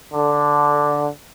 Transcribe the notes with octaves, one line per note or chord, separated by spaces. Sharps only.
D3